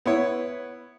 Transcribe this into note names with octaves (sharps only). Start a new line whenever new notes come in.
B3 E4 C#5